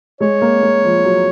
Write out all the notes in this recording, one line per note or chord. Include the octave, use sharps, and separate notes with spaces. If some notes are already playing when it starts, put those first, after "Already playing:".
G#3 C#5
A#3
A#3
F3
F#3